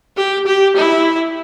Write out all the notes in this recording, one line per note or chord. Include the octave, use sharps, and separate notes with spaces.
G4
G4
E4